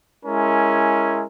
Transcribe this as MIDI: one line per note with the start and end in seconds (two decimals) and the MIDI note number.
0.24 1.23 56
0.24 1.23 61
0.24 1.23 64
0.24 1.23 70